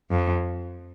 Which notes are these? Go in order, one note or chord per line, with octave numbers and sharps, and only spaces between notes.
F2